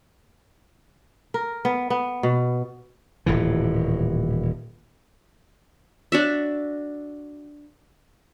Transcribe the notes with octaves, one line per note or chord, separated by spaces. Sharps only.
A#4
B3
B3
B2
D#1 A2 E3
D4 F#4 E5